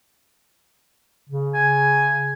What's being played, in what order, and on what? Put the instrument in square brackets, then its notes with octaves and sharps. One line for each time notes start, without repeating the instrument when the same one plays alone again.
[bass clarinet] C#3
[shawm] G#5